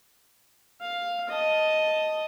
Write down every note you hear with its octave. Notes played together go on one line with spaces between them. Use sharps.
F5
D#5 A5